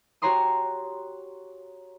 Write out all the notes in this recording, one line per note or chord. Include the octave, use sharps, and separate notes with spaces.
F#4 G4 C#5 A#5 C6 D#6